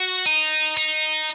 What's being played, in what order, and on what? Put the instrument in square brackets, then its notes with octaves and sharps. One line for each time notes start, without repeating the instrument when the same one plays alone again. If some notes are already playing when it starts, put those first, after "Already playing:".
Already playing: [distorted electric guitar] F#4
D#4
D#4